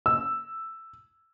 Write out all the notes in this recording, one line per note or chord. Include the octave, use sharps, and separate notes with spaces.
E6